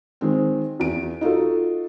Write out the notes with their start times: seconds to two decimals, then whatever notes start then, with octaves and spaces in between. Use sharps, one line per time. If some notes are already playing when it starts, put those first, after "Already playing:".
0.21 D#3 G#3 C4
0.80 E2 D7
1.21 D#4 F4 F#4 A4